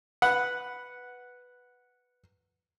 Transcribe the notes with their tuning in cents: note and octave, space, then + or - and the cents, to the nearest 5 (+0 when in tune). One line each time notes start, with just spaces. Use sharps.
B4 +0 F#5 -5